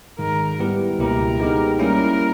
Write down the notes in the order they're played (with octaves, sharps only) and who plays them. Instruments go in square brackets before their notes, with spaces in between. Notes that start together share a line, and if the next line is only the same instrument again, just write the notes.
[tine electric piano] G#2 D#3 G#3 [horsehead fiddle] A#4
[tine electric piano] G3 B3 E4 G4 B4
[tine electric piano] C#2 B2 A#3 E4 G4 [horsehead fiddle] A#4
[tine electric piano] G#3 B3 D#4 G4
[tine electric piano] G3 A#3 C#4 E4 [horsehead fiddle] A#4